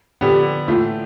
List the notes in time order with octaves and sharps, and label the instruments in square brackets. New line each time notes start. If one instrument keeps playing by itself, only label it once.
[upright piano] D3 F3 B3 [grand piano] G4
[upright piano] A2 E3 A3 [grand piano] F4